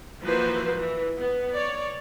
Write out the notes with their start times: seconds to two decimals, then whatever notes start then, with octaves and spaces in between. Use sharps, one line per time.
0.22 E3 F3 A#3 F#4 B4 C5
0.77 E3
1.18 B3
1.52 C#5 D5